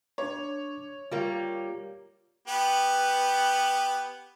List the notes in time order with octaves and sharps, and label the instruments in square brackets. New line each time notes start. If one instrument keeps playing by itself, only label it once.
[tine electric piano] D4 D6 [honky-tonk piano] C#5
[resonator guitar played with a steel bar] G3 A#3 [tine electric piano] F4 G4
[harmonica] B3 G4 B4